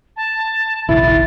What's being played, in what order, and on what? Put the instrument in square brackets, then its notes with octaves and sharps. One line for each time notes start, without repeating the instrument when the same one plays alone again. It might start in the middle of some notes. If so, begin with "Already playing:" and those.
[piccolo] A5
[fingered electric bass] F1 A#1 D#3 [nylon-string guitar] E4 [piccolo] A6